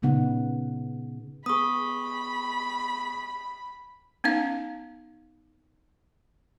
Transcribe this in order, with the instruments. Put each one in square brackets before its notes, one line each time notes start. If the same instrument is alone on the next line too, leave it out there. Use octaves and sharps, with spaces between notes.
[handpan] A#2 C#3 B3 D#4 F#5
[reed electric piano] B3 G#4 [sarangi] B5 [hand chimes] C#6 D#6
[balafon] B3 C#4 D#4 F5